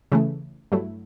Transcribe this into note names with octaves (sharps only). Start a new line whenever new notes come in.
C#3 E3 A3
G2 F#3 A3 E4